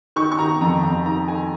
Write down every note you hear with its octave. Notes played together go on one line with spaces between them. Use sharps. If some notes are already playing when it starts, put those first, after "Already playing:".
D#3 C#6
C#6
D#3 A#5
F2 A#5
F2 A#5
D#3 A#5
D#3 G#5